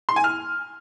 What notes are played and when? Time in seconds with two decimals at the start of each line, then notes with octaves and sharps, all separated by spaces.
0.09 C6
0.16 G#5
0.24 F6